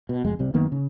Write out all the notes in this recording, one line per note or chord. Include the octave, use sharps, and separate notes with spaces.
B2
F1 F2 G#3
C2 C3 G3
F#2 D#3 A#3 B3
C#3